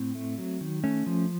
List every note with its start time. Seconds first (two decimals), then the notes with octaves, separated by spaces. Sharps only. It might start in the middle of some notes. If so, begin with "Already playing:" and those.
Already playing: A2 C4
0.15 A3
0.38 F#3
0.61 D#3
0.84 A3 C#4
1.06 F3